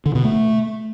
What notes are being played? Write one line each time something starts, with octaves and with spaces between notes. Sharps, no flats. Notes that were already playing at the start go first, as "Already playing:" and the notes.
D3
B2
A3